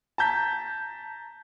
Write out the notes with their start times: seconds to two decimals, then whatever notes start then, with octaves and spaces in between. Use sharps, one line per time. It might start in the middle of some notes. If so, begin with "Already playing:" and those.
0.18 A5 A#5 G6 B6